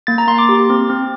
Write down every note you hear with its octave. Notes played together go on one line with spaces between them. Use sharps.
A#3 A6
A#5
A#3 C6
D6
G4
C4
C4